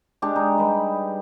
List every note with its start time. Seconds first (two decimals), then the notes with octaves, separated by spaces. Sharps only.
0.22 G#3 D4 G4
0.36 D#4
0.58 G3 B4